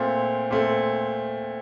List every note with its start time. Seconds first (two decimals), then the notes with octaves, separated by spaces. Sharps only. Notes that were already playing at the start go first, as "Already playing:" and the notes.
Already playing: A#2 A3 C4
0.51 A#2 A3 C4